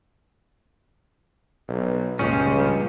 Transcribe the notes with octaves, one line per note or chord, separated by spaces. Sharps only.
B1
C#2 G2 A#2 C#3 F3 C#4